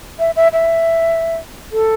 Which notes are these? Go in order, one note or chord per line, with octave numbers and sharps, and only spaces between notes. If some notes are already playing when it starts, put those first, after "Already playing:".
E5
E5
E5
A4